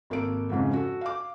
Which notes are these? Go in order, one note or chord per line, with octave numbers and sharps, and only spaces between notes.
G#1 A#3 A4 D7
F2 G#2 C#3
F#4 A4
F5 D6